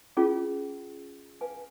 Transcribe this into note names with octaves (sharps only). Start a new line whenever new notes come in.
C#4 F4 G#4
B4 F5 G#5